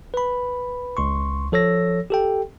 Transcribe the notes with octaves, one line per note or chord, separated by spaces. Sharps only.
B4 B5
C#2 C6 C#6
F3 A4 C#5 E6 A#6
G4 A4 G5